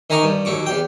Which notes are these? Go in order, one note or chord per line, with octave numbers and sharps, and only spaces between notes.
D#3 D#4 G#5 A#5 C#6 D6
G2
D#2 F#3 C#6 D6
E2 G4 G5